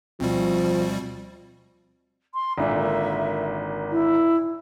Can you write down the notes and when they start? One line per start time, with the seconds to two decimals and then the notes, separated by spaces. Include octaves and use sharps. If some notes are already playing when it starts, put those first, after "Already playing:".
0.20 D2 B2 F3 G3 C4
2.34 C6
2.58 G#1 A#2 D3 E5
3.91 E4